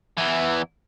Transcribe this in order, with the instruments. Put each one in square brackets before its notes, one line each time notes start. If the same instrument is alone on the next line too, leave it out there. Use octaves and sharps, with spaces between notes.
[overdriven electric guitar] E2 E3